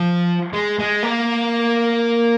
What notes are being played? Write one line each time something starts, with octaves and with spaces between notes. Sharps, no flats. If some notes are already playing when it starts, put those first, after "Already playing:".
Already playing: F3
G#3
G#3
A#3